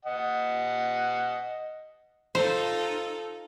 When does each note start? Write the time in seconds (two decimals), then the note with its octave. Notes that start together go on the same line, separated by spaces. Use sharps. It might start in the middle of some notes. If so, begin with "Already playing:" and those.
0.05 D#5 F#5
2.35 D#4 F4 A4 C5